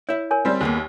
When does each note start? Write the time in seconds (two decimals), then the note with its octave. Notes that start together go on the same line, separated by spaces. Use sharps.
0.09 E4 C#5 E5
0.31 A#4 C#5 G#5
0.45 G3 C4
0.61 D#2 A#3 B3 G#4